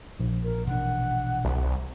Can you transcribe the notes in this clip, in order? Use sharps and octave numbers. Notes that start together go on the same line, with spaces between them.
A#1
A#4
B2 E3 D4 F#5
C2